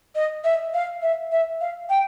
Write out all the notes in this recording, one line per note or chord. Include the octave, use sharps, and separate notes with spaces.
D#5
E5
F5
E5
E5
F5
G5